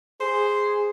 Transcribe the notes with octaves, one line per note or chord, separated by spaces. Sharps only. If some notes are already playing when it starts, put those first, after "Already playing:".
G#4 C5